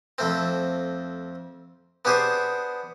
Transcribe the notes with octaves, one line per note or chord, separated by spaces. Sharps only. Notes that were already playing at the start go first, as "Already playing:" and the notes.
F2 A3 C4
B3 D4 G4 G#4 C5